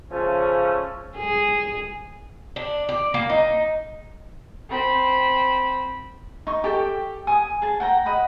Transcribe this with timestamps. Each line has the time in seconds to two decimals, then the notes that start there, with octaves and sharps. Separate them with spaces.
0.12 C#3 F3 A3 C#4
1.17 G#4
2.56 D4
2.89 D5
3.14 A#3
3.30 D#4
4.69 C4 B5
6.47 D#4 C#6
6.64 G4 A4 G5
7.27 G#5 D#6
7.62 G#4 A5
7.80 F#5 G5 A#5
8.06 D#5 F#5 B5